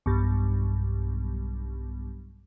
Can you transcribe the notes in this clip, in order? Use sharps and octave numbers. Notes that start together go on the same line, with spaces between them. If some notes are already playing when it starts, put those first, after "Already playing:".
B1 G2